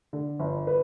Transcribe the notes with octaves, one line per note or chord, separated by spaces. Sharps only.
D3
G1
B4